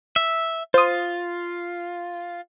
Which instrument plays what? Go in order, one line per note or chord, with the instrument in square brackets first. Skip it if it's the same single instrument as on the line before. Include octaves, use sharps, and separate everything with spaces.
[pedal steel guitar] E5
[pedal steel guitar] F4 [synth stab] C5 D#6